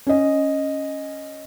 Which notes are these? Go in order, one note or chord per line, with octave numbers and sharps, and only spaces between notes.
C#4 D#5